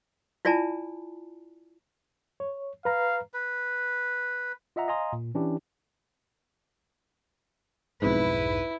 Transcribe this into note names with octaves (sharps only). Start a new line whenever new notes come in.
E4 F4 D5 G#5 A5 B5
C#5
B4 F5 A#5
B4
F4 D#5 E5 F#5 A#5
D#5 F5 G#5 A#5 C6 D#6
A#2
E3 C#4 D4 E4 G4
B1 F2 G#2 E4 B4